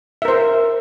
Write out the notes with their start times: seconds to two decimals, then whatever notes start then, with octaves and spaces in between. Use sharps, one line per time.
0.22 E5
0.25 A#4
0.28 C5